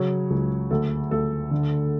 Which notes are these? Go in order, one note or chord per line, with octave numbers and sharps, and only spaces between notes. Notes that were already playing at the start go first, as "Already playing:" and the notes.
Already playing: C#3 F#3 C#5
C#2
D2 A4
D2 A4
D3